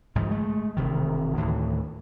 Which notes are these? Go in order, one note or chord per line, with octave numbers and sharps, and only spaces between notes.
G#1 G#2 C#3 F3
G#3 A3
E1 C3 D#3
D2 A2 D#3 E3